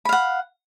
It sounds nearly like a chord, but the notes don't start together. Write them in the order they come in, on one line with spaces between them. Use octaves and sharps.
B5 F5 F#5